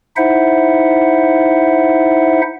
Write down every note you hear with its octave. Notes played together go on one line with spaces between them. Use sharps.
D#4 E4 C5 E5 F#5